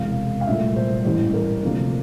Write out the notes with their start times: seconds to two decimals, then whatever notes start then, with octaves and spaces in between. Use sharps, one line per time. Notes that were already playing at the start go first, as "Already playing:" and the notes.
Already playing: E1 E2 C3 F5
0.41 F5
0.47 C2 A#2 A3 D4 E5
0.76 C5
1.05 A1 G2 E3 G3
1.34 A#4
1.63 D2 C3 F3 A#3 D4